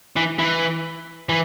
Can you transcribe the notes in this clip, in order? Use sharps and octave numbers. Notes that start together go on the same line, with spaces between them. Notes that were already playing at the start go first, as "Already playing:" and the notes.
E3
E3
E3